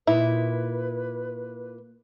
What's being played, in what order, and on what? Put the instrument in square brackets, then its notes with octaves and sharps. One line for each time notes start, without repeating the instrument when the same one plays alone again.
[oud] A#2 D#4 [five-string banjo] E4 [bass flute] B4